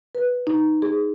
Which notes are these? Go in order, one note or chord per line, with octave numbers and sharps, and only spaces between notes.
B4
D#4
G#4